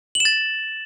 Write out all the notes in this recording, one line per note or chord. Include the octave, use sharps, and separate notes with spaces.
F#7
E7
A6